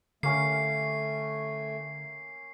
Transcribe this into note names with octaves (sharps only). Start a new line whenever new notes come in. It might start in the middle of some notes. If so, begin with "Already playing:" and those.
D3 A3 A#3 C#4 A#4 C7